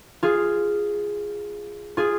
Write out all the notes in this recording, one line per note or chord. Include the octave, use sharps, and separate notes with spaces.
F4 G#4
F4 G#4